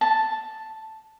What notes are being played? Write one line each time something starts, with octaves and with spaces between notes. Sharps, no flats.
A5